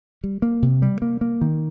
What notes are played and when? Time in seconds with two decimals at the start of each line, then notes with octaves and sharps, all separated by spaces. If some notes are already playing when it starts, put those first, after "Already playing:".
0.24 G3
0.42 A#3
0.62 C3
0.82 G3
1.02 A#3
1.21 A#3
1.41 D#3